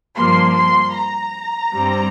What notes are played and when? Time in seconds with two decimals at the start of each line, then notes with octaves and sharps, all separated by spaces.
0.16 G2 F3 A#3 C6
0.56 C6
0.95 A#5
1.74 G2 G3 C4